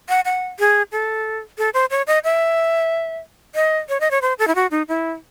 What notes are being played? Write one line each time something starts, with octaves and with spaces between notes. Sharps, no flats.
F#5
F#5
G#4
A4
A4
C5
C#5
D#5
E5
D#5
C#5
D#5
C#5
C5
A4
E4
F#4
D#4
E4